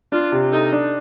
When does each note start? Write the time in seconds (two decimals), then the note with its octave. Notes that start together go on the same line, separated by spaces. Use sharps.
0.12 D4 F4
0.32 C3
0.52 D#4 A4
0.72 D4